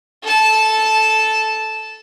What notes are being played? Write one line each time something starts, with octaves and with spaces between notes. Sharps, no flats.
A4 A5